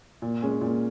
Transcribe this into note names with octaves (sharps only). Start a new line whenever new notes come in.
A#2
G#3 C#4
A#2